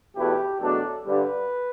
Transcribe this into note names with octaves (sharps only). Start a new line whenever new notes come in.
E2 B2 A3 E4 G4 B4
E2 B2 F#3 A3 D4 A4
G2 D3 G3 B4